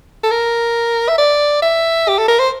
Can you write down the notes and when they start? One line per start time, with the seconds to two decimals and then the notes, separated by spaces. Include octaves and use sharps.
0.23 A4
0.31 A#4
1.09 E5
1.18 D5
1.62 E5
2.08 G4
2.18 A4
2.28 A#4
2.39 C5